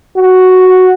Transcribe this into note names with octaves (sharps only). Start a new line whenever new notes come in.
F#4